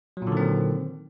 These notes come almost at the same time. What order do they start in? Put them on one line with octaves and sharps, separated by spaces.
F#3 A#2 D3 D#3 C4